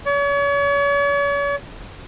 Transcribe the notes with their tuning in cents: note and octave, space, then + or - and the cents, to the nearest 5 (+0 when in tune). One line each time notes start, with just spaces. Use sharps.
C#5 +40